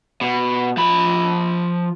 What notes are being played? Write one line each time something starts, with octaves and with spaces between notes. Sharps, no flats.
B2
F3 B5